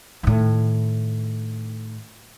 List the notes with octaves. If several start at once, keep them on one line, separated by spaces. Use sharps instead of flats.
A2 D#3